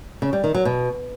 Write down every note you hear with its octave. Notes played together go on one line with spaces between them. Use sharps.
C#3
G3
D#3
F#3
B2